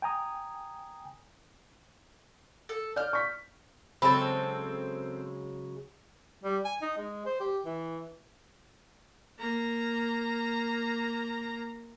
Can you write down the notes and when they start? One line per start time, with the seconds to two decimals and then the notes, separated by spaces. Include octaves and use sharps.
0.02 G5 G#5 A#5 D#6
2.69 A4
2.96 D5 F6 G6
3.13 C#6 B6
4.02 C#3 F#3 G#3 C4 A4 B5
6.43 G3
6.64 G#5
6.81 D#4
6.98 G#3
7.25 C5
7.40 G4
7.66 E3
9.39 A#3 A#5